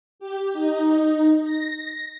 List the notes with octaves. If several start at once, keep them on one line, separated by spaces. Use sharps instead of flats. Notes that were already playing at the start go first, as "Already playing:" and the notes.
G4
D#4
A#6